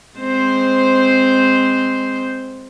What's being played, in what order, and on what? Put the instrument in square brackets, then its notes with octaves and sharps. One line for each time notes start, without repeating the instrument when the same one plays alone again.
[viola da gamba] G#3 C4 C5